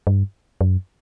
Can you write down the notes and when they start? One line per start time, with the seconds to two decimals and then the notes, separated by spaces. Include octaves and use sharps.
0.07 G2
0.61 F#2